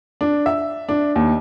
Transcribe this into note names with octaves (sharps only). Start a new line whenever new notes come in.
D4
E5
D4
D#2